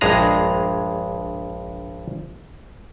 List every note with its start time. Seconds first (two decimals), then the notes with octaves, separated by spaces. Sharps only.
0.01 A#1 G2 G#3 G#4 A#5